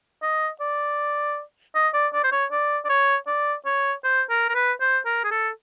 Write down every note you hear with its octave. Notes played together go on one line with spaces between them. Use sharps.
D#5
D5
D#5
D5
D5
C5
C#5
D5
D5
C#5
D5
C#5
C5
A#4
A#4
B4
C5
A#4
G#4
A4